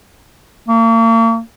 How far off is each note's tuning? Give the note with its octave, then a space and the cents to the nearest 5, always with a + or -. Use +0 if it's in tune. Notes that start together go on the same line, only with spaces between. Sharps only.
A#3 -40